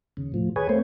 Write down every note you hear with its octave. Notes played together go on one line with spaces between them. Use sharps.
D#2 C#3
A2 F3
D#2 G#4 B4 C#5 G#5
A3 A#3 C4 C5 C#5